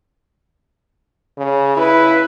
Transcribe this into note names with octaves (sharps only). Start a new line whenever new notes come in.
C#3
E4 B4